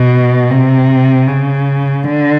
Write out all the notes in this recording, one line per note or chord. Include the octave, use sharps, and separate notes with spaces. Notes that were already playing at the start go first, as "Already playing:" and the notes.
Already playing: B2
C3
C#3
D3